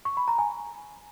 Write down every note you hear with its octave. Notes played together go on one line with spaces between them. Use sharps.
C#6
B5
A#5
G#5